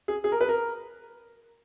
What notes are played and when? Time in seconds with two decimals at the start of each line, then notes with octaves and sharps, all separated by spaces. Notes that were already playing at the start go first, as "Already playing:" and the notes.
0.08 G#4
0.24 G#4
0.32 A#4
0.41 B4
0.49 A#4